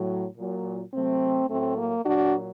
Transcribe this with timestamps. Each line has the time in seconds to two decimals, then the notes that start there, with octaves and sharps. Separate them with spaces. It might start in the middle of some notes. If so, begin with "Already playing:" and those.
Already playing: A2 F#3
0.38 A#2 F#3
0.94 C3 F#3 A3 C4
1.50 A2 F#3 A3 C4
1.78 A#3
2.06 A#2 F#3 D4 F#4